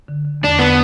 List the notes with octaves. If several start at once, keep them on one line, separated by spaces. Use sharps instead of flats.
D3
D3
E2 D4
D3 B3